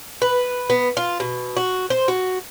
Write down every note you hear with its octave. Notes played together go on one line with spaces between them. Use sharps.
B4
B3
F4
B2
F#4
C5
F#4